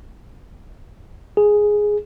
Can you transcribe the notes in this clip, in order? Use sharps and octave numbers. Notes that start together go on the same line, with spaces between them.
G#4